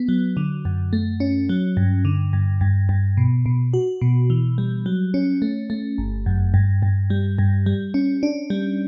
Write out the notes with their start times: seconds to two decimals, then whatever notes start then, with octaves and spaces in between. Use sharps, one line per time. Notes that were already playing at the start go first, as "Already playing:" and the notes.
Already playing: B3
0.09 F#3
0.37 D3
0.65 F#2
0.93 A3
1.20 C#4
1.49 F#3
1.77 G2
2.05 D3
2.33 G2
2.61 G2
2.89 G2
3.17 B2
3.46 B2
3.74 F#4
4.01 B2
4.30 E3
4.58 G3
4.86 F#3
5.14 C#4
5.42 A3
5.70 A3
5.98 G1
6.26 F#2
6.54 G2
6.82 G2
7.10 G3
7.38 G2
7.66 G3
7.94 C#4
8.23 D4
8.50 G3